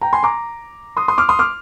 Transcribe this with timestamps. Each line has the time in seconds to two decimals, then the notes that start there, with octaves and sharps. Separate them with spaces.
0.01 G5 A#5
0.13 G#5 C6
0.23 A#5 D6
0.97 C6 D#6
1.08 C6 D#6
1.18 D6 F6
1.29 C6 D#6
1.39 D6 F6